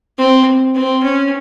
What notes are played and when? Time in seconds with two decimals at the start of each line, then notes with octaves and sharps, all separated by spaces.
0.18 C4
0.75 C4
1.03 C#4